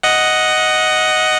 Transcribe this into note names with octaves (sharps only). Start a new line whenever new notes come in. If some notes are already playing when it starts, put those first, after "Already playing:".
D#5 F#5